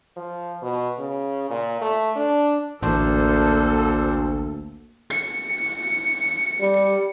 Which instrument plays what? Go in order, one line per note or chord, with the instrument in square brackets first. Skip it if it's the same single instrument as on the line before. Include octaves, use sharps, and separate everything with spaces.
[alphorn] F3
B2
C#3
A#2
A3
D4
[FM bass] A1 [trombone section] D2 [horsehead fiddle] A#3 A4 [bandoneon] D4 C5
[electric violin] C#7
[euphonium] G3